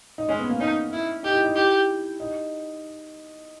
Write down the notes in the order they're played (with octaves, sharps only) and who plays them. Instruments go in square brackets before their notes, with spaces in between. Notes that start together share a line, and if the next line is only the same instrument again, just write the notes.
[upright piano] D#4
[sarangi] G#3 [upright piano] C#4
[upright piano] B3
A#3
[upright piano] C#4 [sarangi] D#4
[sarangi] E4
[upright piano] D#4 [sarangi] G4
[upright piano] E4
D#4
[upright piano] E4 [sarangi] G4
[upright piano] D#4